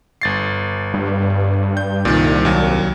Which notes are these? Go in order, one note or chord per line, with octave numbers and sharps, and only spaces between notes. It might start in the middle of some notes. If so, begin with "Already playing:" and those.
G1 A6 C7
G2
G6
C2 A#2 D#3
D#2 F#3